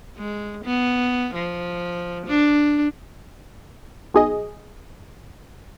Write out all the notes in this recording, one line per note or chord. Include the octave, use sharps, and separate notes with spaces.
G#3
B3
F3
D4
B1 G#4 D#5